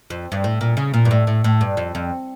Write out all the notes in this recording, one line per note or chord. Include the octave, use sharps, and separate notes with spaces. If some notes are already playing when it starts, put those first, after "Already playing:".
F2
G2
A2
A#2
C#3
A#2
G2
A2
A2
A2
G2
F2
F2